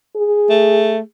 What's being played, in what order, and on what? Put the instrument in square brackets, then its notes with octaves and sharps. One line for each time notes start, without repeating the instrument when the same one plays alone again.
[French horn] G#4
[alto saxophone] A3